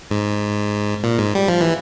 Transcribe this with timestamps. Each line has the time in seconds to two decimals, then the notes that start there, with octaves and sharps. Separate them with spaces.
0.11 G#2
1.04 A#2
1.19 G#2
1.35 G3
1.48 F3
1.61 E3